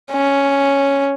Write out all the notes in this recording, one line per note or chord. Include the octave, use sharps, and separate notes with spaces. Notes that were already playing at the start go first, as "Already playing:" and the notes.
C#4